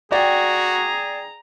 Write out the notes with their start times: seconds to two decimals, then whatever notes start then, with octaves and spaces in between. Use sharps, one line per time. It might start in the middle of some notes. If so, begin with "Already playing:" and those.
0.12 F#4 G#4 D5 G5 A#5